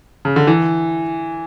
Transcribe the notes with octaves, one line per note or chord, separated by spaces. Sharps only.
C#3
D3
E3